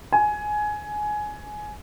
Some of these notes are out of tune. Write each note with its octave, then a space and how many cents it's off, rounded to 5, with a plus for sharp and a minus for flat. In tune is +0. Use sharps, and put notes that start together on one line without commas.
G#5 +15